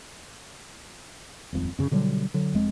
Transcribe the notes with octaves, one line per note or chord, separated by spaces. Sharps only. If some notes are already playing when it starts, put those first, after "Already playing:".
D#1 G#1 F2
F#2 C#3
B2 D3 F#3 G3
D3 F#3
F1 F2 G#3